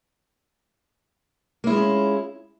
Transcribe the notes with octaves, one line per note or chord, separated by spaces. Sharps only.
G#3 A#3 C#4 E4 F4